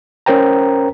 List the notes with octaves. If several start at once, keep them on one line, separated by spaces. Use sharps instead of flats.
C#4 A#4 C5 G5 A#5